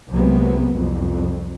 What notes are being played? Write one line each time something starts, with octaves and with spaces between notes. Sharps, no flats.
C2 C3 F#3 G#3 A#3 B3
C2 F2